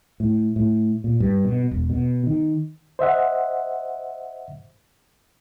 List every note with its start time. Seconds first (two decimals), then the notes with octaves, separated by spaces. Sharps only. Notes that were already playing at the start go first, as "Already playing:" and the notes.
0.20 A2
0.56 A2
1.04 A#2
1.20 G2
1.45 B2
1.71 E1
1.90 B2
2.26 D#3
2.99 C5 D#5 E5 F#5